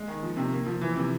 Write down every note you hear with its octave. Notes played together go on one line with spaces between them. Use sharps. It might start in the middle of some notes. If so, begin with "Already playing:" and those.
Already playing: G#3
D#3
F3
C3
A#3
F3
E3
C3